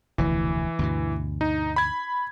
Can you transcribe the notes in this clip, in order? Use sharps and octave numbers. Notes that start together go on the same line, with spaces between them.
F1 D2 B2 E3
D2 G2 B2
D#4
B5 G#6